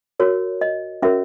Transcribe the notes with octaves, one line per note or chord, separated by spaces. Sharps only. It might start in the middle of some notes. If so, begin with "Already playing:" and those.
F#4 A#4 C#5
D#5
C#4 F#4 A#4 C#5 E5